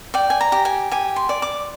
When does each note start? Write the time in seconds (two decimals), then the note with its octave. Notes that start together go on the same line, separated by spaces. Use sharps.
0.14 D5 G5
0.30 G#5
0.41 A#5
0.52 G4
0.65 G#5
0.91 G4 G#5
1.16 C6
1.29 D5
1.42 D6